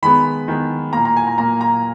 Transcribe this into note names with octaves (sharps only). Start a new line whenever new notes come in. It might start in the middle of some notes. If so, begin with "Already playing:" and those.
D#3 G#3 B3 B5
D#3 G#3 B3
A#2 A#3 A#5
A#5
G#5
A#5
A#2 A#3 A#5
A#5